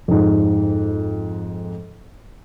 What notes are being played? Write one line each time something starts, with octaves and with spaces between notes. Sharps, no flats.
F2 G#2